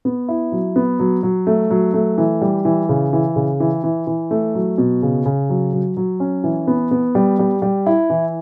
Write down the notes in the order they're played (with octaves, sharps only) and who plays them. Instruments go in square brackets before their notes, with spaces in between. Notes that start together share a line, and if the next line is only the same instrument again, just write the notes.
[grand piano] B3
E4
F#3
B3
F#3
F#3
A3
F#3
A3
E3
G3
E3
C#3
E3
C#3
E3
E3
E3
A3
F#3
B2
C#3
C#3
F#3
F#3
F#3
C#4
E3
B3
B3
G3
G3
G3
E4
E3